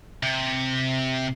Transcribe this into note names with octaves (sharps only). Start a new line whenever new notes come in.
C3